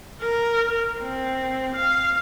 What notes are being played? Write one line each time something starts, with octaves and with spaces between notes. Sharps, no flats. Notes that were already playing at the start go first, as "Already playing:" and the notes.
A#4
C4
F5